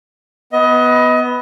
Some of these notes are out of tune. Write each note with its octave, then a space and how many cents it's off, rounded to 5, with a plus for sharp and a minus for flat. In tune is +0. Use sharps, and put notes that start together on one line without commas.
B3 +0 D#5 +25